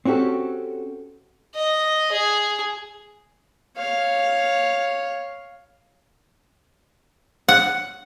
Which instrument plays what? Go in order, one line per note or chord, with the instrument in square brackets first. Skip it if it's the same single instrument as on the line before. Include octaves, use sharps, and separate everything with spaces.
[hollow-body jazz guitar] C4 C#4 F#4 G4 A4
[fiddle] D#5
G#4
[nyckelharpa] C#5 F5
[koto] F#5